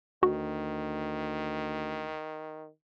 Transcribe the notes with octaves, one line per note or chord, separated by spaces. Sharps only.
D2 D#3 F#4